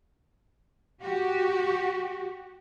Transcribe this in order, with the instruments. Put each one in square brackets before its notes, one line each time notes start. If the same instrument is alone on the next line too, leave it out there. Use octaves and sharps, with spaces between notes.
[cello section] F#4 G4